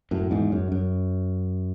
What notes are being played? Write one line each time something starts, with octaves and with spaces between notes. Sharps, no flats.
F#2 A2
E2 G#2
F#2
F#2